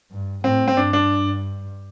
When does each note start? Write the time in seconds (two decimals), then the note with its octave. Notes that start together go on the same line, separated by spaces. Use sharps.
0.11 G2
0.44 A2 C4
0.68 C4
0.77 G2 D4
0.93 D4